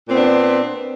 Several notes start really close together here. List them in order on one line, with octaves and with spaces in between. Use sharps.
A#2 C4 B3 D4